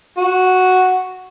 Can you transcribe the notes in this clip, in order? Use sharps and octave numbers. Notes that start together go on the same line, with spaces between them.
F#4